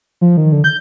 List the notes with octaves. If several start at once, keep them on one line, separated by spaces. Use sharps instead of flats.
F3
D#3
D3
G6